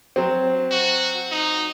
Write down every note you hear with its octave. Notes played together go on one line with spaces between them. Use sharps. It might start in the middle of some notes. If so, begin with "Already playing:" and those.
F#3 C4
F#4
D#4